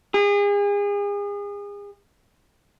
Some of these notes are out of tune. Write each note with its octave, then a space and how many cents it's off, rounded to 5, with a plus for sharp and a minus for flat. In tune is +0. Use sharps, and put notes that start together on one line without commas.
G#4 -35